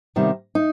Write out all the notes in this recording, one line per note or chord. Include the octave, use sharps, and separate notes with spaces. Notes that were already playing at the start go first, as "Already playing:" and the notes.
C3 D#3 G3 B3
D#4